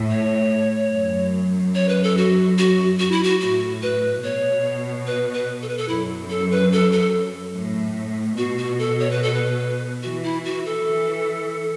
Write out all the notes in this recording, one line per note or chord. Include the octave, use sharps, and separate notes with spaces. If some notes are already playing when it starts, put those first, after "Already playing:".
Already playing: A2
C#5
F#2
C#5
B4
A4
F#4
F#4
F#4
E4
F#4
A2 F#4
B4
B2 C#5
B4
B4
A4
B4
A4
F#2 E4
A4
B4
A4
A4
A2
B2 F#4
F#4
A4
C#5
B4
A4
B4
E3 F#4
E4
F#4
A4
E3